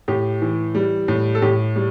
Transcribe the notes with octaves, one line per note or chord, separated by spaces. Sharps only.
A2 G4
E3
G3
A2
A4
A2 G4
G3